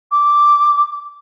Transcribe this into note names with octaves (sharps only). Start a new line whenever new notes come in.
D6